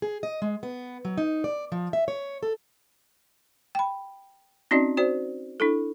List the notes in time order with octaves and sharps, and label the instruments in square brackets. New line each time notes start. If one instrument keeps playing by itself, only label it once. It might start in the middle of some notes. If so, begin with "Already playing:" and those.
[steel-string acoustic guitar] G#4
D#5
G#3
B3
F#3
D#4
D5
F3
E5
C#5
A4
[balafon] G5 B5
C4 C#4 D#4 F#4 D5 D#5
F#4 C5 D5
D4 E4 A4